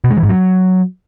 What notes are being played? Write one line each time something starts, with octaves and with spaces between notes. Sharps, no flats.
B2
G#3
E3
G#2
F#3